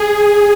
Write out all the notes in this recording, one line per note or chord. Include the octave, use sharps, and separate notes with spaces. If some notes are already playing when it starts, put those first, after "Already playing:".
Already playing: G#4